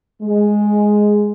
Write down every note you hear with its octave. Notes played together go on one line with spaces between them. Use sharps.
G#3